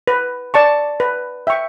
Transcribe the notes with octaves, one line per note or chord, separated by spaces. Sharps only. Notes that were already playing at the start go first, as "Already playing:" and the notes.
B4
D5 A5 C#6
B4
E5 G5 C#6